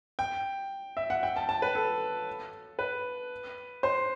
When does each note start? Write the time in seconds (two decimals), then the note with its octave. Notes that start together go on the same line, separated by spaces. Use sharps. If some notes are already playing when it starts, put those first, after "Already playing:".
0.19 G5
0.97 E5
1.10 F#5
1.23 G5
1.36 A5
1.49 A5
1.62 B4
1.75 A4
2.79 B4
3.83 C5